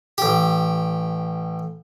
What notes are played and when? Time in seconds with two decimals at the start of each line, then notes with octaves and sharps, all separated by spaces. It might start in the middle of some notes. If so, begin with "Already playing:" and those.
0.18 A1 G4